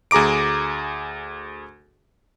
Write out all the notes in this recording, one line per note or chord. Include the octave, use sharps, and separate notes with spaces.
D2 G#4 A#5 D6 D7